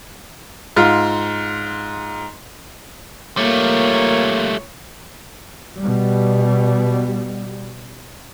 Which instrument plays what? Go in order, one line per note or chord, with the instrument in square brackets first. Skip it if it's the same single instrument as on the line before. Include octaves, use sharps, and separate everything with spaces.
[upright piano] G#2 F4
[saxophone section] A#2 C#5 [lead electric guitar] G3 A3 [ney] A#3
[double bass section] B2 G3